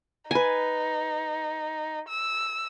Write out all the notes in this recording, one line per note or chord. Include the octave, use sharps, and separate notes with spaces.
D#4 B4 G#5
E6